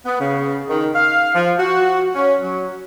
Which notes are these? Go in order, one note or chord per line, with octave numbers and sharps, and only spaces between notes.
B3
C#3
D#3
F5
F3
F#4
C#4
F#3